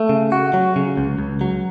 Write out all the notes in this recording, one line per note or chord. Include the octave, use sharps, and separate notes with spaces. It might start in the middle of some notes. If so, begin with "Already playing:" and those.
Already playing: A3
C#3
F#4
F#3
C#3
C#2
C#2
F#3